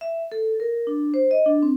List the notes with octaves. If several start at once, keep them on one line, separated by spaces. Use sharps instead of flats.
E5
A4
A#4
D4
C5
D#5
D4
C4